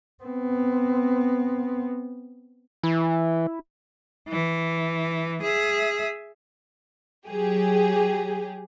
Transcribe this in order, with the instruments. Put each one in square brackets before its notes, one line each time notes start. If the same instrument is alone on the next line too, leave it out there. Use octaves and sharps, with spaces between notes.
[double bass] B3 C4
[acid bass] E3 [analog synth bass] E4
[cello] E3
G#4 E5
[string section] F#3 G4 G#4